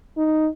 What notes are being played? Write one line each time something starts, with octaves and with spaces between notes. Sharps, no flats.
D#4